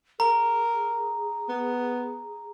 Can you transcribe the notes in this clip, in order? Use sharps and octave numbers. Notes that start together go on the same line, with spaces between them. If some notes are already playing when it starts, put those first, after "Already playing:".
G#4 A#4 A#5
B3